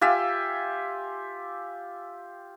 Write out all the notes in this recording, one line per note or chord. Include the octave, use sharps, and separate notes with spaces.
F4 G4 E5 G#5